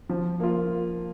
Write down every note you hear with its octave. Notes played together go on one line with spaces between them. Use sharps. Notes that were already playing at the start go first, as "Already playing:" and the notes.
F3
A#3 F4